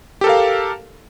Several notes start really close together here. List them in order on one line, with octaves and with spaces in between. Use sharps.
G4 A4 A#4 F5